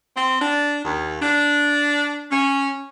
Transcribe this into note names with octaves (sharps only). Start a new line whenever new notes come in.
C4
D4
D#2
D4
C#4